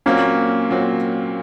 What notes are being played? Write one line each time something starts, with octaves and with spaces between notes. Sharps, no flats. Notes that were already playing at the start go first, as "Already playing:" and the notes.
A#2 F#3 A#3 C4 C#4
A#2 F#3 C4